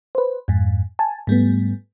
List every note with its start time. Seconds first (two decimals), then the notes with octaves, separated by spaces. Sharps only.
0.15 B4 C5
0.48 F2 G#2
0.99 G#5 A5
1.27 G#2 G3 A3 B3